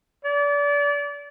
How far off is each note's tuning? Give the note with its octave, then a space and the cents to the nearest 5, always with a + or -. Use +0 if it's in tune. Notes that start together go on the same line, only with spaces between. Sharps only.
D5 -30